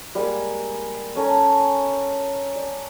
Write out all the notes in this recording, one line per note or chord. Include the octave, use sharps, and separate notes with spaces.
G3 G#3 A#3 G#4
C#4 A4 G#5 A#5
D5